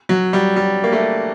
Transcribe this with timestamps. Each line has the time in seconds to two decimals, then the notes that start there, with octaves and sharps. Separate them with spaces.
0.09 F#3
0.33 G3
0.56 G3
0.84 A#3
0.92 A3